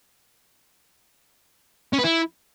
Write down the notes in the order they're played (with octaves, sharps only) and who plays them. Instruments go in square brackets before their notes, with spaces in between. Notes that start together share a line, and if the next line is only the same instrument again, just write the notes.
[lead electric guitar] C#4
B4
E4